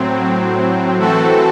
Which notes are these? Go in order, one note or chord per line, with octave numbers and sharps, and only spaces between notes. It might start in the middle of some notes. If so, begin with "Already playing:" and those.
Already playing: A2 F#3 C4
E3 A3 C4 F#4 A4